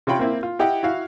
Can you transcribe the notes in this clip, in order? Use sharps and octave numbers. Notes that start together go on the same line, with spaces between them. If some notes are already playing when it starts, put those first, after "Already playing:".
C3 C#4 F4 G5 B5
A#3 C4 E4
F4
E4 G4 D#5 F#5 G5
E4 F#4 F5